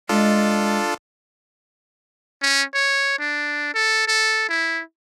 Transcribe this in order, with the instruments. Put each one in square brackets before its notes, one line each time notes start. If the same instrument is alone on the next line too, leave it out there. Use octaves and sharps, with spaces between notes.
[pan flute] G#3 [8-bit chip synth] D4 F4 A4
[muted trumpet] C#4
C#5
D4
A4
A4
E4